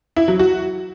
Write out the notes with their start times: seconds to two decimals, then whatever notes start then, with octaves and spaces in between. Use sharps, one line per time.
0.16 E4
0.28 F#3
0.39 F#4